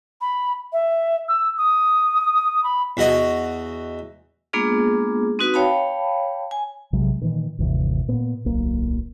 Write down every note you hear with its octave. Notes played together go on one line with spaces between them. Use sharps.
B5
E5
E6
D#6
B5
E2 F#4 D#5
G#3 A#3 B3 D4 F4 G#4
C4 D#4 F#4 B4
C#5 F5 G5 A5 B5
G#5
A#1 C3 F#3 G#3
A#2 D#3 E3
G1 D#2 C3 E3
A#2 B3
D1 B1 A#3